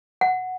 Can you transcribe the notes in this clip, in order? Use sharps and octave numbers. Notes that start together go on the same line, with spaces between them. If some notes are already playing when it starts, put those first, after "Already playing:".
F#5